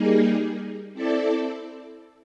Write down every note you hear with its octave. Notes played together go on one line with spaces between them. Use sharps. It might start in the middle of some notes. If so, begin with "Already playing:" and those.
Already playing: G3 A#3 D#4 G#4
C4 E4 A4 D5